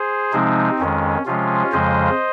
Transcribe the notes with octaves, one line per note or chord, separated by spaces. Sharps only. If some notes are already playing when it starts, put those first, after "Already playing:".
Already playing: G#4 C5
C3 F3 G#3 C4 D#4
F2 D#3 G#3 C#4
C3 F3 G#3 C#4 F4
F2 C#3 F3 G#3 C5 D#5